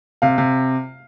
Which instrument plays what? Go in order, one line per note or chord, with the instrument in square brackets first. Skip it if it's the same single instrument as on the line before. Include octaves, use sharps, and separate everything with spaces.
[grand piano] C3 [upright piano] F5
[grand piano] C3